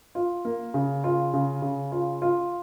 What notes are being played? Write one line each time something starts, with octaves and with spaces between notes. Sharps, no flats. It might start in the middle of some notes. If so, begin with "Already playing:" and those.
F4
A#3
C#3
F4
C#3
C#3
F4
F4